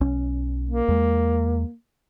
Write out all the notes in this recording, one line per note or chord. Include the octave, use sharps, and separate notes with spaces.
B1 C#4
A#3
E2 G#3